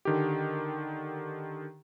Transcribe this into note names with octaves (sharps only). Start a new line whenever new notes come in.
D3 D#3 G4